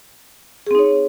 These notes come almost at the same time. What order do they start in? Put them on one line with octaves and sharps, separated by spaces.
G#4 C4 D#4 C#5